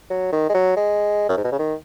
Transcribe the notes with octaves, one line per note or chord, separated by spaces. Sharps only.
F#3
D#3
G#3
F#3
G#3
F#2
G#2
B2
C#3
D#3